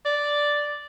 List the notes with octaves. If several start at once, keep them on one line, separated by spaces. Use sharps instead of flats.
D5